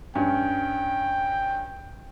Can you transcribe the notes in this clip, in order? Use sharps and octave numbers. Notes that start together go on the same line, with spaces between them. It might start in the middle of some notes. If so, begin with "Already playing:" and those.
G2 C#4 G5